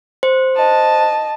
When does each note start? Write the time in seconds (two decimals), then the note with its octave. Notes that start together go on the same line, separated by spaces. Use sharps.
0.23 C5
0.56 D#5 A5